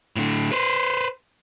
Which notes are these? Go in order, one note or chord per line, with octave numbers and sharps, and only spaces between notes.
A2 D3
B4 C5